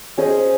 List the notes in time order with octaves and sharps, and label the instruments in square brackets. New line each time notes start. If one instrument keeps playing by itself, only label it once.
[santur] C#4 G#4 C5 D#5